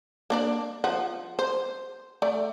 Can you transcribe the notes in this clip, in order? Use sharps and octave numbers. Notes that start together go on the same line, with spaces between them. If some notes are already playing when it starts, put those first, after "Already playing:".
A#3 D4 D5
F3 F#5
C5
A3 D5